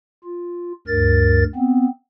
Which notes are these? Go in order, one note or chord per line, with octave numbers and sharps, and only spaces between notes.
F4
D2 G2 A#4 A6
B3 C4